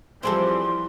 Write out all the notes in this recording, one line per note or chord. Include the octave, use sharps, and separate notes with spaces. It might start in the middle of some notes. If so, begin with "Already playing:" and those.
E3 F3 G3 C4 G#4 A4 C6